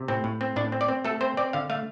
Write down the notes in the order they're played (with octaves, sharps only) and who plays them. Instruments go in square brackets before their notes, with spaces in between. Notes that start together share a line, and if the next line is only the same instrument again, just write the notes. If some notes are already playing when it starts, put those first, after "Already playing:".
Already playing: [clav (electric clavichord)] C3
A2 C4
A2
C4
A2 D4
C4
D5
C4
A3 A4
C4 C5
C4 D5
D3 F5
A3 F5